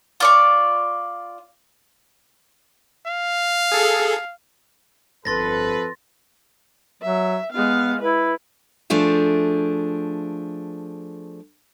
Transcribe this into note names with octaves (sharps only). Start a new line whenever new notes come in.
F4 D5 C#6
F5
G#4 A4
G1 F2 A4 B4 C6 A6 A#6
F#3 E5
G#3 B3 F5
E4 B4
F3 A3 D4 G#4